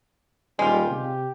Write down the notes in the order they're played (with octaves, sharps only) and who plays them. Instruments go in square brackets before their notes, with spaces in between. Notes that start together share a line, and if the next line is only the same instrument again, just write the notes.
[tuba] D#1 [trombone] G3 [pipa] G#3 F4
[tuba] C3 [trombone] G4